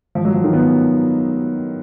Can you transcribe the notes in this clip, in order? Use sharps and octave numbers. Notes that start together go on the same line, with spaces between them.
F3
F#3
F3
D#3
B3